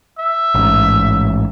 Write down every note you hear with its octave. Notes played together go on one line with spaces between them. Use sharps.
E5
A1 G#2